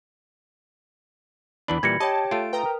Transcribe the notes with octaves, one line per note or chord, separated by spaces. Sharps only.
E2 E3 D4 B5
A#2 E3 G3 G#6 A#6 C#7
G4 C#5 D#5 G5 A5
A3 F4 D7
B4 G5 A#5 D#6
A#4